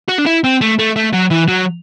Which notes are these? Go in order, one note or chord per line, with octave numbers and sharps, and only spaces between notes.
F#4
D4
E4
C4
A3
A3
A3
F#3
E3
F#3